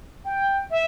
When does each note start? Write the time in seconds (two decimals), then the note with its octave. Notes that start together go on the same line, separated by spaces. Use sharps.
0.25 G5
0.71 E5